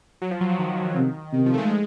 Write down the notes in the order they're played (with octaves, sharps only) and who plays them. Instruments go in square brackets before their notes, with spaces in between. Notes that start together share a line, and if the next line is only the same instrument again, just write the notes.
[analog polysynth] F#3
F3
F#3
F3
D#3
[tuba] C3 [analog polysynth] D#3
[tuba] C3 [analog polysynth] D#3
[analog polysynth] F3
A3
G#3
G#3